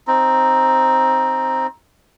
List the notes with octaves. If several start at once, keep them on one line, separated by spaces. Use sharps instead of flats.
C4 D#4